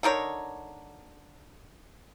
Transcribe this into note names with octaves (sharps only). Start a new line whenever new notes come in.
D3 D#4 A#4 C#5